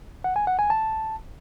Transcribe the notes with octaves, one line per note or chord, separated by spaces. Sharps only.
F#5
G#5
F#5
G#5
A5